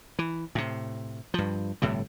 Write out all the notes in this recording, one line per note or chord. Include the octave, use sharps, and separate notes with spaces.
E3
A2 C3
G2 F3
G1 A2 C3 G3